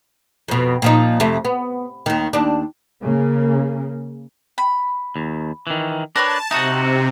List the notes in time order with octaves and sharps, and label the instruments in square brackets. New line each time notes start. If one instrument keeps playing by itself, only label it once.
[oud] F2 B2
A#2 F3 D#4
F2 C3 A3
B3
D#2 D#3
D#2 D4
[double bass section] C#3 A#3
[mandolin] B5
[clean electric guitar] D#2
D#3 E3
[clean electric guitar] D4 [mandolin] A#4 B4 C#5 [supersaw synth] A5
[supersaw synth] C3 [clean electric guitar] D#4 F#4 [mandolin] E5 D#6